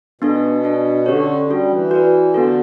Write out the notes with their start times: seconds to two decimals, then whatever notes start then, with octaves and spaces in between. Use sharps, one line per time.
0.21 B2 B3 D4 A4
0.64 D4 A4 D5
1.06 D3 C#4 G4 C#5
1.48 G3 D4 F#4 A4
1.70 E3
1.91 F#4 B4 D5
2.34 D3 B3 F#4 A4